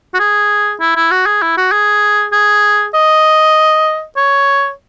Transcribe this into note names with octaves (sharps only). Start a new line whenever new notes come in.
F#4
G#4
E4
E4
F#4
G#4
E4
F#4
G#4
G#4
D#5
C#5